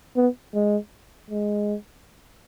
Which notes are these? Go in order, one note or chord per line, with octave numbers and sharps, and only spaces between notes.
B3
G#3
G#3